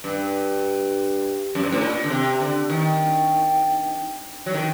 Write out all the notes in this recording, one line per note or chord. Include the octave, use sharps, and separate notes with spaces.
G2
F#2
G2
A2
A#2
D3
C3
D3
D#3
F#3
D#3